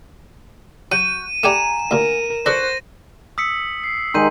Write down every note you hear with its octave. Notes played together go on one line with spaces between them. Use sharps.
F#3 F#4 G6 D#7
A3 G4 D5 F#5 G#5 A#5 E7
D2 A#2 A#4
D4 F#4 A4 B4 C5 A#6
D#6 E6 B6 C#7
C7
D#3 G#3 C6 G6 D#7